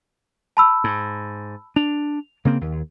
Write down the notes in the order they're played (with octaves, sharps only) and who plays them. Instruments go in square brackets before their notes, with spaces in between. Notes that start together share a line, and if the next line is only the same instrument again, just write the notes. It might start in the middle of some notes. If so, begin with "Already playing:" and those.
[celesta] A5 B5 E6
[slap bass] G#2
[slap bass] D4 [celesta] F7
[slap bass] C#3 A#3 C4
D#2